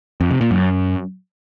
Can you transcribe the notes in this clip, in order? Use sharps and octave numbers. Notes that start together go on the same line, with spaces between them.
F2
C3
A#2
F#2